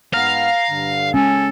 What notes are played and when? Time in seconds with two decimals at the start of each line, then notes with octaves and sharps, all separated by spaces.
0.14 G#2 B3 F5 A#5
0.69 G2 D3
1.14 G#3 C#4 A4 G#5